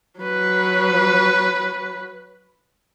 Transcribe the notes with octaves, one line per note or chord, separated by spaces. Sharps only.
F#3 B4